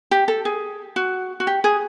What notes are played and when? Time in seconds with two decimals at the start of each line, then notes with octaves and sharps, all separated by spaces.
0.11 G4
0.28 A4
0.45 G#4
0.96 F#4
1.40 F#4
1.47 G4
1.64 G#4